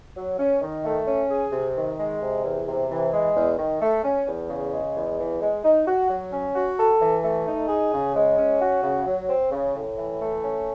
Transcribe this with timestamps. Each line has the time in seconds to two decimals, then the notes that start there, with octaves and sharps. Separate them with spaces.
0.16 F#3
0.39 C#4
0.61 D#3
0.84 A3
1.06 C#4
1.30 G#4
1.52 C3
1.76 D#3
1.99 G#3
2.21 C3
2.44 E2
2.67 C3
2.90 E3
3.12 G#3
3.35 E2
3.58 D#3
3.81 A3
4.04 C#4
4.26 E2
4.49 C#3
4.72 G#3
4.95 E2
5.18 E3
5.41 G#3
5.64 D#4
5.87 F#4
6.09 F#3
6.31 C#4
6.55 F#4
6.78 A4
7.01 E3
7.24 A3
7.47 D#4
7.68 G#4
7.92 C#3
8.15 G#3
8.38 C#4
8.61 F#4
8.83 C#3
9.06 F#3
9.28 C4
9.51 C#3
9.74 A2
9.97 E3
10.21 A3
10.43 C#4